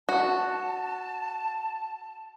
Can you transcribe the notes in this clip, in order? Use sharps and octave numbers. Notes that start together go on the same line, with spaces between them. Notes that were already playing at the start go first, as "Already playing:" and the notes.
F#4 A5